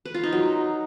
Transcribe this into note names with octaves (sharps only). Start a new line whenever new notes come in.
B4
F4
D#4
F#3